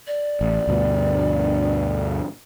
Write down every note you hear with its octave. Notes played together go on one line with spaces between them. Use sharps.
D5
A1
D2 G2 B2